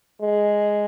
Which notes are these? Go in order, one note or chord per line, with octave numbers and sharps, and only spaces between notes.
G#3